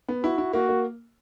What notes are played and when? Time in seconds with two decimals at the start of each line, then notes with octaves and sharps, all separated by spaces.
0.08 B3
0.24 E4 F#4
0.38 E4
0.53 A#3 F#4
0.69 A#3